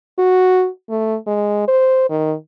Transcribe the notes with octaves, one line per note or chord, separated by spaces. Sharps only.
F#4
A3
G#3
C5
D#3